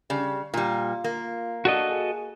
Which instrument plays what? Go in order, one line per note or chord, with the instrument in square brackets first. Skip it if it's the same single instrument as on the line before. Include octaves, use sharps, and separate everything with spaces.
[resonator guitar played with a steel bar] C#3 [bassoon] G3
[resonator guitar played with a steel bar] A#2 G3 [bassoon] F4
[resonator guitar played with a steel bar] A#3
[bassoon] D4 [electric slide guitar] F#4 A4 D#5
[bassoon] G#4